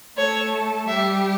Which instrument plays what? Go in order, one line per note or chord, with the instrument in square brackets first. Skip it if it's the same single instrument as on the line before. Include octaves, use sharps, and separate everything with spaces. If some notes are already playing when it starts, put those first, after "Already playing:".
[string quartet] A3 A4 [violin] C#5
[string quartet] G3 G4 [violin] E5